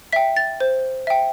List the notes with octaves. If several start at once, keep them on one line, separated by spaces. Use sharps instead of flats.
E5 G5 B6
A6
C5
E5 G5